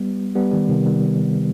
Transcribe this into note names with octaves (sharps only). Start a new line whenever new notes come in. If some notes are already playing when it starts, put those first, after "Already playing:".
Already playing: G3 B3
G3 B3
D#3 G3
C3 D#3
D#3 G3